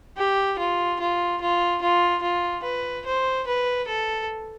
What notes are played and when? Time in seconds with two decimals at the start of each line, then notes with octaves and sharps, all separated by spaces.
0.18 G4
0.59 F4
1.00 F4
1.41 F4
1.82 F4
2.23 F4
2.64 B4
3.06 C5
3.47 B4
3.88 A4